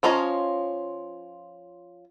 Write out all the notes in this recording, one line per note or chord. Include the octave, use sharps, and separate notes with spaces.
F3 C#4 F4 D#5 A#5